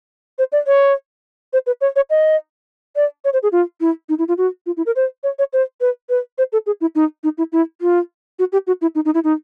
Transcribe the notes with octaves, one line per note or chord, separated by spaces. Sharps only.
C5
D5
C#5
C5
B4
C#5
C#5
D#5
D5
C#5
C5
G#4
F4
E4
D#4
E4
F4
F#4
F4
E4
A#4
C5
C#5
C#5
C5
B4
B4
C5
A4
G#4
E4
D#4
D#4
E4
E4
F4
F#4
G4
F#4
E4
D#4
D#4
E4
D#4